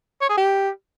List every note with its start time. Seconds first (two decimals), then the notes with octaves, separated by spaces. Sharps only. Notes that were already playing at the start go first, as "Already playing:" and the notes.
0.21 C#5
0.29 G#4
0.38 G4